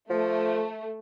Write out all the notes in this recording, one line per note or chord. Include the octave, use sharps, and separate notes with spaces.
F3 A3